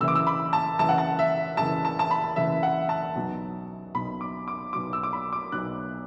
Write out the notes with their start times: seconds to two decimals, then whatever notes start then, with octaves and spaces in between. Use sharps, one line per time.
0.01 F#1 F#2 E3 E6
0.08 D6
0.15 E6
0.27 B5
0.53 A5
0.79 F#1 F#2 E3 A5
0.89 F#5
0.98 A5
1.19 E5
1.57 F#1 F#2 E3 A5
1.85 A5
1.99 A5
2.11 B5
2.36 F#1 F#2 E3 E5
2.63 F#5
2.89 A5
3.16 B1 B2 F#3
3.95 B1 B2 F#3 B5
4.21 D6
4.48 D6
4.73 B1 B2 F#3 D6
4.93 E6
5.03 D6
5.13 B5
5.33 D6
5.52 B1 B2 F#3 F#6